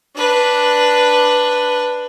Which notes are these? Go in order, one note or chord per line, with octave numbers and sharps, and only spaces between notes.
D4 B4